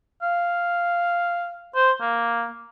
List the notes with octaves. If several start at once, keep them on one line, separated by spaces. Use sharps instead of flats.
F5
C5
A#3